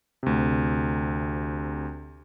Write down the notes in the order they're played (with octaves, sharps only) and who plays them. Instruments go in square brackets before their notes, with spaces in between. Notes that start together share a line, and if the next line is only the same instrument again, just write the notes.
[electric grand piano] D2 C3